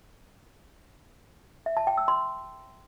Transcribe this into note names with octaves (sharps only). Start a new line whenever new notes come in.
E5
A5
G5
E6
C6